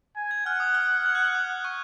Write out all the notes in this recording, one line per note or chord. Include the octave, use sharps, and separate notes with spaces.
G#5
G#6
F#5 F6
D#6
F6
G#6
F#6
F6
D#6
C#6